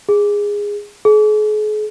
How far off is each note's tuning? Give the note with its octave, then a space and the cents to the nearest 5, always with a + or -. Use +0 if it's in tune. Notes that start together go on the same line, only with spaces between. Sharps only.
G#4 -15
G#4 +40